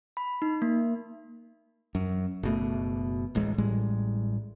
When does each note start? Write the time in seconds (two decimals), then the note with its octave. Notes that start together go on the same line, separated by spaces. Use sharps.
0.17 B5
0.42 D#4
0.62 A#3
1.95 F#2
2.43 F#1 B2 A3
3.35 D1 A1 G#3
3.58 A1 A2 G3 G#3